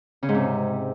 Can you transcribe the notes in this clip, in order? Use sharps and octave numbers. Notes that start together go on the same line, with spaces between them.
C#3
G#2
C3